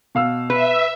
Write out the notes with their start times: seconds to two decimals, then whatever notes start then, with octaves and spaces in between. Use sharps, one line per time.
0.15 B2 F5 E6
0.50 B4 E5